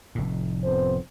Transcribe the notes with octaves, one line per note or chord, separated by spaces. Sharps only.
F1 A2
F2 B3 C5